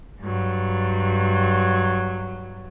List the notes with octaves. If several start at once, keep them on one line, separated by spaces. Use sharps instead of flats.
G2 F#3